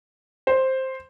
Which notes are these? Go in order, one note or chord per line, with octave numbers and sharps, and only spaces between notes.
C5